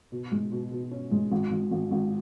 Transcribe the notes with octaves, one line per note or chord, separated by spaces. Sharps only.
B2
G#3
B2
B2
C#4
G#3
G#1
G#1
G#1
G#1